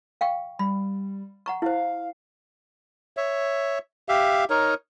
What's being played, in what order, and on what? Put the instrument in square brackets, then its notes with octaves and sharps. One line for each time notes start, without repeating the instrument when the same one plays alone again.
[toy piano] F5 G5 C#6
[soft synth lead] G3 [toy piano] B5
[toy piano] F#5 A#5 C#6
[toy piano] E4 C5 [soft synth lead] F5
[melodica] C#5 E5
G4 E5 F5
D#4 A#4 C#5